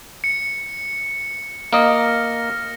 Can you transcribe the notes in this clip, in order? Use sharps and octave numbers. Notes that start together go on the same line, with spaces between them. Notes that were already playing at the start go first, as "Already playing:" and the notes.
C#7
A#3 D#5 F6 A#6